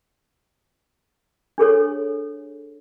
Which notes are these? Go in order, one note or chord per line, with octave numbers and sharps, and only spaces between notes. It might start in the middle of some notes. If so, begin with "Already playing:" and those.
D4 G#4 A4 C#5